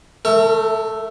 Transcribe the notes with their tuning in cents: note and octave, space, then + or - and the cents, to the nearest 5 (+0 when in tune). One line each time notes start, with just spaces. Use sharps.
A3 +0 A#4 -45